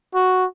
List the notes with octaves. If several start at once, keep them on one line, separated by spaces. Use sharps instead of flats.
F#4